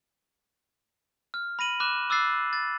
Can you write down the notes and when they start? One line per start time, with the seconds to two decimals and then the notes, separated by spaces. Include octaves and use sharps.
1.34 F6
1.59 B5 A#6 D#7 F#7
1.80 B5 D6 F#6 E7
2.10 D6 E6 F#6 A6 C7
2.53 A6